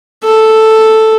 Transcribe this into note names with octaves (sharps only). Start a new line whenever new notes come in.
A4